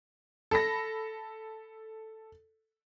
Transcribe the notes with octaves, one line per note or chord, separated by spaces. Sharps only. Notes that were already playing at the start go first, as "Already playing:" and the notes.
A4 B5 A#6